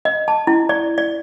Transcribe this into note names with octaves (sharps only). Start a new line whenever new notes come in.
D#5
A5
E4
D5
D5